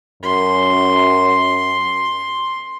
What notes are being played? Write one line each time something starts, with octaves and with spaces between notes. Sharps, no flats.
F#2 C6